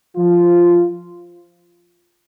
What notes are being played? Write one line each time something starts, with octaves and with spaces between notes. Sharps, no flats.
F3 F4